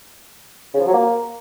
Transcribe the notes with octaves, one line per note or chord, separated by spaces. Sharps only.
C#3
F3
F#3
A#3